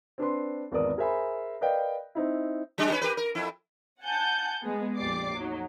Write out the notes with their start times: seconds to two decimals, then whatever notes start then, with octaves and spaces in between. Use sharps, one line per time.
0.18 C4 D4 B4 C6
0.72 G#1 E2 B3 A#4 D5 D#6
0.98 G#4 A#4 C5 E5 G#5 B5
1.61 A#4 B4 D5 D#5 F5 G5
2.15 C4 D#4 E4
2.78 F#3 G#3 D4
2.90 D#3 C#4 B4
3.01 G4 A#4 B4
3.17 A#4
3.35 F2 E4
4.02 F#5 G#5 A5 G6
4.61 G#3 B3 G#4
4.96 A#1 F2 G4 D5 D6 C7
5.34 F2 F#3 D#4